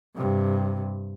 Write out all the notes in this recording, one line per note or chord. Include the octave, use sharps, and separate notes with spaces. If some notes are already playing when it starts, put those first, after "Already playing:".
G2 C3